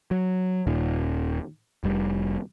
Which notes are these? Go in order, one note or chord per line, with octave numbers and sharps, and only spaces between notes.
F#3
D#1 D#2 A#2 D#3
F1 G3